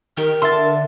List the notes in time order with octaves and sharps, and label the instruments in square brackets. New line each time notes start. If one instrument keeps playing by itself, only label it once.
[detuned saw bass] D#3 [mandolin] G4 [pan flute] A#4
[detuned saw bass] D3 [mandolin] E5 A5 [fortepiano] C6